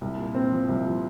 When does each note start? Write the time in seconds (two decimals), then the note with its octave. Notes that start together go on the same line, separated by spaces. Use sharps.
0.01 C2
0.18 A#2
0.35 C4
0.52 F3
0.69 C2
0.87 F3